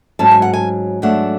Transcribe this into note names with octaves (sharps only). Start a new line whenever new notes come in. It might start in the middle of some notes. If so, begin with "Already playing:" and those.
G#2 F#3 C#4 A5
G#5
F#5
G#5
G#2 F#3 A3 D4 F#5